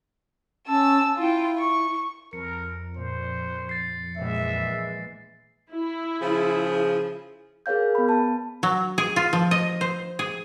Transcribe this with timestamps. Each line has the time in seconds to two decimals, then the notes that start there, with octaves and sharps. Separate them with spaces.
0.68 C#4 A5 E6
1.18 E4 F4 G5
1.58 C#6
2.33 F2 A#4 C#7
2.96 A#2 C5
3.69 A6 C7
4.16 A#1 E3 G#3 E5
5.71 E4
6.21 C#3 F3 G#4
7.66 G#4 A#4 C#5 F5 G6
7.95 B3 B5
8.09 A5
8.63 F#3
8.98 G#4
9.16 F4
9.33 F3
9.51 D#5
9.81 C5
10.19 G#4